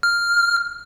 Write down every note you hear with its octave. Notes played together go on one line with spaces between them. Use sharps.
F6